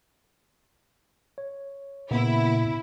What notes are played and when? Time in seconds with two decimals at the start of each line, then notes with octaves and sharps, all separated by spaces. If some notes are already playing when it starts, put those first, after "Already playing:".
1.38 C#5
2.11 A#2 C#3 A#3 B3 E4